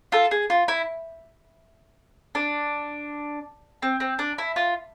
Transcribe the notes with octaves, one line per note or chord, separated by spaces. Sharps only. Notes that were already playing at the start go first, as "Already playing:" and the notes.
F4 A4
G#4
F4
E4
D4
C4
C4
D4
E4
F4